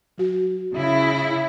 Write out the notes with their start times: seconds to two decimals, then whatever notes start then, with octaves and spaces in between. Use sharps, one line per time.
0.18 F#3 F#4
0.73 C#3 E4